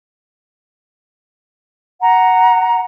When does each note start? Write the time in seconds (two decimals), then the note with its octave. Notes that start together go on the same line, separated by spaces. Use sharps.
2.02 F#5 A#5